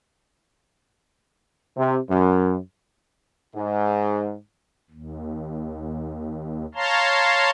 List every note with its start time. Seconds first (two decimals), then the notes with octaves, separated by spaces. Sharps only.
1.77 C3
2.09 F#2
3.55 G#2
4.91 D#2
6.75 C#5 F5 A5 A#5 C6